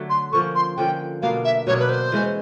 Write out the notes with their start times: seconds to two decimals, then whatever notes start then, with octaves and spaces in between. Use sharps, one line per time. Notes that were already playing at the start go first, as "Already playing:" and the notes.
Already playing: D3 F#3 A3
0.10 C6
0.33 D3 F3 A#3 C#4 C#6
0.55 C6
0.77 D3 F3 A#3 C#4 G5
1.22 B2 F#3 A#3 D4 F5
1.45 E5
1.67 B2 F#3 A#3 D4 C#5
1.80 B4
1.89 C5
2.12 E3 G#3 C#4